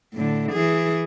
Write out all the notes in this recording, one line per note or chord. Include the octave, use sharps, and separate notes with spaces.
A2 D3
E3 G#4